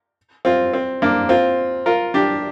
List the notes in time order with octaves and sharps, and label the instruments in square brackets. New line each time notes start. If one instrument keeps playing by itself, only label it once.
[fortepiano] C4 F4
C4
A#3 D4
C4 F4
F4 A#4
D4 G4